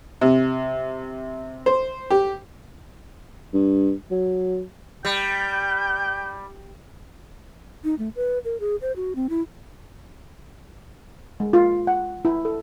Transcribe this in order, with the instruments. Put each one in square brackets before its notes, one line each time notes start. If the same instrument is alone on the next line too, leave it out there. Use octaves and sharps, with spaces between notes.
[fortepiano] C3
C5
G4
[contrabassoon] G2
F#3
[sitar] G3 [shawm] G5
[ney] D#4
A3
B4
A#4
G#4
C5
F#4
C4
E4
[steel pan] G#3
F4
F#5
E4
A4